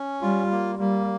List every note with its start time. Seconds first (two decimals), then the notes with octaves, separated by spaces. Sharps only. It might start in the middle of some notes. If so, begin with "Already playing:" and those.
Already playing: C#4
0.22 G3 F4
0.51 A#3
0.79 G3 A#3